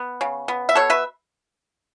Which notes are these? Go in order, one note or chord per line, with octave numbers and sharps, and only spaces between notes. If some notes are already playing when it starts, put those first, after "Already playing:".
Already playing: B3
C#3
B3
E5
B2 A4 C#5
B4 E5